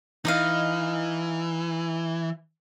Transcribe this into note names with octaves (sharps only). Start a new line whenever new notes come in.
E3 D#4 D#5 F5